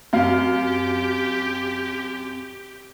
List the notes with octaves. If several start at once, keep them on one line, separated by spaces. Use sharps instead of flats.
F#2 C4 G4 F5